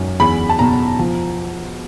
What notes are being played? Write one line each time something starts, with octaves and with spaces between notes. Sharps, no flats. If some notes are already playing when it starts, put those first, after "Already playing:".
Already playing: F#2
E2 B5
A5
B2 A#5
F3